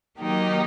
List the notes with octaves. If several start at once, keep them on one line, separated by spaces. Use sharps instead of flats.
D#3 F#3 A#3 D#4 G4